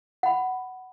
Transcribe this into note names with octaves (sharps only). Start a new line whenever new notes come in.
F#5 B5